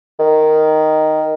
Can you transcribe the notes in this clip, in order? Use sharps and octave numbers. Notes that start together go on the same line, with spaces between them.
D#3